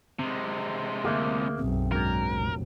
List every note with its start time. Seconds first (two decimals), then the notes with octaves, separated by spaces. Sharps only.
0.19 C3 G#3 C4
1.05 D2 A#3 G#4 A#4 E5
1.59 B1 F#2 C4
1.92 E2 G#2 F#3 D4 A#4
2.31 F1 A#1